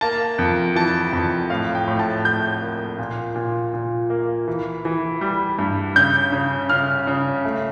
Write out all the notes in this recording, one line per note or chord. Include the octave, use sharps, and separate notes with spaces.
A#3 A5
F2
E3 A5
F2
A2 F5
G5
A2
A5
A2 G6
A#3
A#2
A#2
A#2
A#3
E3
E3
G3
G2
C#3 G6
C#3
C#3 F6
C#3
A3